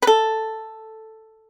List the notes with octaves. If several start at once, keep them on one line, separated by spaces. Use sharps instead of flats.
B4
A4